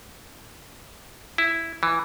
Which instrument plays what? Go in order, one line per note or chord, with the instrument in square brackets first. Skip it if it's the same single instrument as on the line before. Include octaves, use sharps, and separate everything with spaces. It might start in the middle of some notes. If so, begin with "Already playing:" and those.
[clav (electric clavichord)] E4
E3